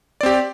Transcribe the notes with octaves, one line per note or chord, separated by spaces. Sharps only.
C4 G4 D5